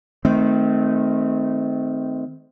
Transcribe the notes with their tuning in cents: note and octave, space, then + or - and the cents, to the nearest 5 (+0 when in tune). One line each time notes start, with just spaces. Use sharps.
D#3 +0 A3 -25 C4 -20